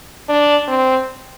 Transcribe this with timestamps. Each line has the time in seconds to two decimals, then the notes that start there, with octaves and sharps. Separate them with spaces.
0.28 D4
0.68 C4